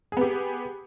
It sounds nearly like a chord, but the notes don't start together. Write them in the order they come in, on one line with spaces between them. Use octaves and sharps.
G#4 B3 G4